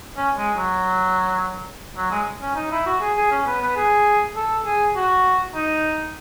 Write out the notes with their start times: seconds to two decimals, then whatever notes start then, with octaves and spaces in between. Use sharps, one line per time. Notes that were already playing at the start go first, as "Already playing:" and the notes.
0.17 C#4
0.37 G#3
0.57 F#3
1.97 F#3
2.11 G#3
2.42 C#4
2.56 D#4
2.71 E4
2.86 F#4
3.01 G#4
3.17 G#4
3.31 C#4
3.46 B3
3.61 B3
3.76 G#4
4.36 A4
4.66 G#4
4.96 F#4
5.55 D#4